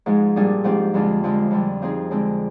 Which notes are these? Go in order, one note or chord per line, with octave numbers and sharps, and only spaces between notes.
G#2 F3 G#3
A#2 G3 D4 G#4
G#2 F3 C4 G4
F2 D3 G#3 D4 F4
D3 F3 G#3
F2 D3 G3
F3 C4 D#4 G#4
D3 G#3 C4